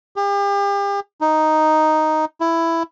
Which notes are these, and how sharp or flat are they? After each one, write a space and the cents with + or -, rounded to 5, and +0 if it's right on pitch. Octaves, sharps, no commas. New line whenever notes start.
G4 +40
D#4 +0
E4 +10